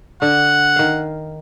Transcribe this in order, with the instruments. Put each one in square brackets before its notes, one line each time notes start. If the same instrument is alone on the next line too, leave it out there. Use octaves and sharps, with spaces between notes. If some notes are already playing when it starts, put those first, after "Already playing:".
[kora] D3 [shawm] F#5
[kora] D#3 F5